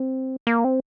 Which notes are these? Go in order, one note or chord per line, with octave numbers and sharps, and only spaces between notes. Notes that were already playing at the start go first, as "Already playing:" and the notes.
Already playing: C4
A#3
C4